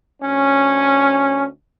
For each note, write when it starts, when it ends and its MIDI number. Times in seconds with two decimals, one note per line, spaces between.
0.23 1.47 38
0.23 1.47 61